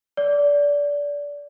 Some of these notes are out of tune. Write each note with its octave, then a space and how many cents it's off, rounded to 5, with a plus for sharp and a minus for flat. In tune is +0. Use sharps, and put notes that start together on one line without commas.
D5 -20